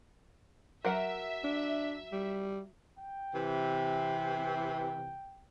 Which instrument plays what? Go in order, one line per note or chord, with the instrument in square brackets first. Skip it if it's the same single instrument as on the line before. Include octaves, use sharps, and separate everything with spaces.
[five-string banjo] F#3 A#4 F#5 [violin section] E5
[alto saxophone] D4
G3
[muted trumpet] G5
[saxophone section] C3 E3